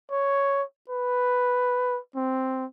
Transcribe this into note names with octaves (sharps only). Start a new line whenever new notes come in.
C#5
B4
C4